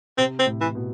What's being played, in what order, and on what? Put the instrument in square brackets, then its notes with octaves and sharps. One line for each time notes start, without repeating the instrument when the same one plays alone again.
[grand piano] C3 [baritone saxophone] C4
[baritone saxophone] C4
[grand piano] A2
[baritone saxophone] E3
[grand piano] B2